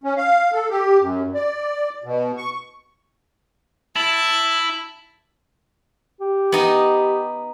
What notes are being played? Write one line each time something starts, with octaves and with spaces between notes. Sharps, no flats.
C#4
F5
A4
G4
F#2
D5
B2
C#6
E4 A5
G4
B3 D#4 D#5